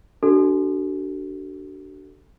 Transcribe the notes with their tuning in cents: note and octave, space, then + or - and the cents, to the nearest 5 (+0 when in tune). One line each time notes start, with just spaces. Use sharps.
D4 +0 F#4 +35 A4 +0